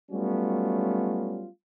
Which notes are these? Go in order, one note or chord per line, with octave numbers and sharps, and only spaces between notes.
F#3 G3 A3 B3 C#4 F4